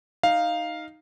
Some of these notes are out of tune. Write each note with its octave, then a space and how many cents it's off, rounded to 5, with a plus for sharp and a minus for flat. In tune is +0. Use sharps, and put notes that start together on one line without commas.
D#4 +0 F5 +0